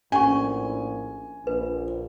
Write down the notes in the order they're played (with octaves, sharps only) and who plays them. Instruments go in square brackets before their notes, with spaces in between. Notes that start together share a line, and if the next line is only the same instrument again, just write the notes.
[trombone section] A#1 A2 [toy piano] C#4 C#6 [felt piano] G#5
[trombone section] A#1 [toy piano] B4